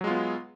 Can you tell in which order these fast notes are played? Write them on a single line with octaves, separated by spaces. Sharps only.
F#3 G#3 F4 B3